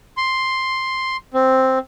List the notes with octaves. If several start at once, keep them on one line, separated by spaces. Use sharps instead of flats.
C6
C4